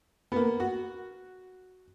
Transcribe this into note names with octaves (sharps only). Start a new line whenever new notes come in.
A#3 B3
F#4